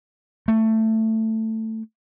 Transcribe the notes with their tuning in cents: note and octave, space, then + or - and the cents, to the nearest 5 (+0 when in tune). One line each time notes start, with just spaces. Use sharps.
A3 +10